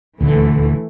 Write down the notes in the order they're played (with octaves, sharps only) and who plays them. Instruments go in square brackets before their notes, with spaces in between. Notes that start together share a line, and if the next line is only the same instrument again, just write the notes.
[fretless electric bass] D#1 D2 D3 [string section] E3 A3